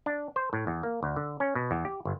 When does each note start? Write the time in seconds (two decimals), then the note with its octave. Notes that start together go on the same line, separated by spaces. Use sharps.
0.06 D4
0.36 C5
0.53 A2
0.67 E2
0.83 A#3
1.03 D2
1.16 D3
1.40 C#4
1.55 B2
1.71 E2
1.85 G4
2.05 G1